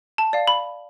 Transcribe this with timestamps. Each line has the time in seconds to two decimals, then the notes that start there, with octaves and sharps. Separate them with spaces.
0.18 A5
0.33 D5 F5
0.48 B5